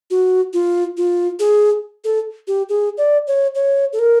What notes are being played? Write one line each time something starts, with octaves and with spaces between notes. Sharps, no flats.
F#4
F4
F4
G#4
A4
G4
G#4
D5
C#5
C#5
A4
A#4